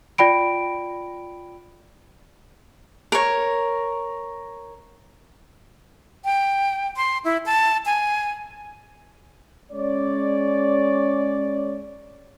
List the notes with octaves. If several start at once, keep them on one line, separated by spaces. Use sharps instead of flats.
F4 D5 G5 B5 D7
A#4 C#5
G5
C6
E4
A5
G#5
G#3 C#4 C#5 D5